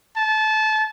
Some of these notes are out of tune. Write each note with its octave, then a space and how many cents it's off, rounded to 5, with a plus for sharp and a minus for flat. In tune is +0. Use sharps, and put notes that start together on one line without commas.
A5 -25